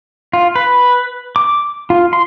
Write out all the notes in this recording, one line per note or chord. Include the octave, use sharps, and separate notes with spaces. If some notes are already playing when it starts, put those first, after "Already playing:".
F4
B4
D6
F4
C6